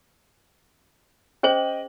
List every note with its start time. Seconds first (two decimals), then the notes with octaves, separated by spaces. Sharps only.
1.43 C#4 G#4 C5 D#5 G5 F#7